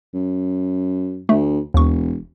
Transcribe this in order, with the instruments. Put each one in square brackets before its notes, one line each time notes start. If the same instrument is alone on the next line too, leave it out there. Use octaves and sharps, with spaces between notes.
[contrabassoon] F#2
[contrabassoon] D2 [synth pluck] A3
[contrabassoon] E1 [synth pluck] D#2 C#6